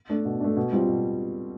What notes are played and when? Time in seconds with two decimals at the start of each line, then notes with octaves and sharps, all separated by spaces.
0.09 A3 D4
0.25 B2
0.40 A3 D4
0.56 B2
0.73 G3 C4 F4
0.88 B2